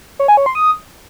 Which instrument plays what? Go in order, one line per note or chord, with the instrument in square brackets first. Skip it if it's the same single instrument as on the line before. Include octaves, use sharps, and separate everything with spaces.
[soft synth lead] C#5
G#5
C#5
C6
D#6